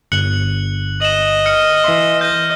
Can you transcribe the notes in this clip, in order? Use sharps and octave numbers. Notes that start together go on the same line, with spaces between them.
G1 F#6 C#7 F#7
D#5 E7 F#7
F6 C#7
E3 E5 C6
D#5 G6